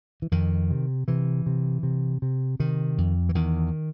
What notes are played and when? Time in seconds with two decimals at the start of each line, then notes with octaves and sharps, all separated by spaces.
0.22 E3
0.32 F2 D#3
0.71 C3
1.08 C3 E3
1.46 C3
1.83 C3
2.22 C3
2.60 C3 D#3
2.98 F2
3.29 E3
3.35 E2 D#3